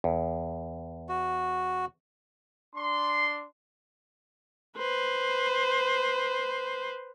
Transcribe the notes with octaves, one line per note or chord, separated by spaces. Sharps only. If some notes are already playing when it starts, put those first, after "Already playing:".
E2
F#4
D4 C6
B4 C5